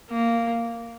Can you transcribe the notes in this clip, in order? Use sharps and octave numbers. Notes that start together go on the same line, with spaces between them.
A#3